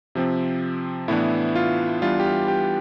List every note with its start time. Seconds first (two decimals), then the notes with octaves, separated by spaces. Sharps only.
0.15 C3 F3 C4
1.08 A2 E3 B3 D4 E4
1.55 F4
2.02 E3 G3 B3 D4 F4
2.20 G4
2.26 F4
2.48 G4